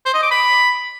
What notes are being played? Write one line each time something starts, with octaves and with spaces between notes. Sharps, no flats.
C5
D#5
D6
B5